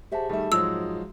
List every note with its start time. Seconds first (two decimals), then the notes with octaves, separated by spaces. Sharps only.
0.12 G4 G#4 C5 E5 F#5 A5
0.29 D#3 G3 A3 E5
0.52 G#2 F3 F#3 G#3 F#4 D#6 E6